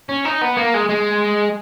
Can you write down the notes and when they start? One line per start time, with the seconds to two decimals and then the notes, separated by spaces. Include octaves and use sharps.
0.09 C#4
0.25 D#4
0.41 B3
0.57 A#3
0.74 G#3
0.89 G#3